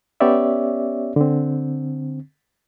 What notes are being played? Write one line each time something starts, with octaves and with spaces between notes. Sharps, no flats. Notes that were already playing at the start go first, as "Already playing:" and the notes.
B3 C#4 G4 C#5 D5 E5
D3 C4